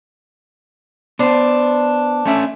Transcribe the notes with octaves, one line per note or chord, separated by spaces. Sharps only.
B3 D4 C5
A3 C#4 E5